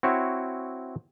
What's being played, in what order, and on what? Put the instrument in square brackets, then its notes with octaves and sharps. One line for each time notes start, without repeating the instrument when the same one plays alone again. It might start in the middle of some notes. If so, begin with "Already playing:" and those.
[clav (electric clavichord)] C4 E4 F#4 C#5